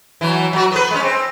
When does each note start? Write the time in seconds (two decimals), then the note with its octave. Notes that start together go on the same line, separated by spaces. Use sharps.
0.21 E3 F#3
0.53 F#3 F#4
0.71 B3 B4
0.91 G#3 C#4
1.03 C4